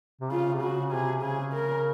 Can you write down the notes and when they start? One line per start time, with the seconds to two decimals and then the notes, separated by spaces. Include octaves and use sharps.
0.21 C3
0.31 C#3 F4
0.54 C3
0.62 C#3 F#4
0.92 C3 G#4
1.23 C#3 G#4
1.53 A#4